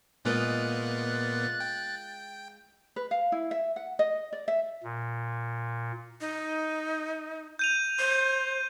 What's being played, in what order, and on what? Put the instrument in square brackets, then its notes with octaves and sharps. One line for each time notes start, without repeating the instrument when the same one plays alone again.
[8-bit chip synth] A#2 A#3 B3 [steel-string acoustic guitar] G#3 F4 D#5 [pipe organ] F#6 A6
[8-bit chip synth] G5
[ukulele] B4
F5
E4
E5
F#5
D#5
D5
E5
[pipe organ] A#2
[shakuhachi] D#4
[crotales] G6 D#7 F7
[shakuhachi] C5